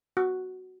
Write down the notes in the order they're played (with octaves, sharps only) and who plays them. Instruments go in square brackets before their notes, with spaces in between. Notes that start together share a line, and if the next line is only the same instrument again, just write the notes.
[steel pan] F#4